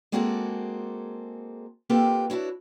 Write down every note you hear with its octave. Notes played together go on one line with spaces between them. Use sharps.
G#3 A#3 C4 F#4 G#4 A4
A#3 C4 F4 G4 A4 B4
D4 E4 F#4 C#5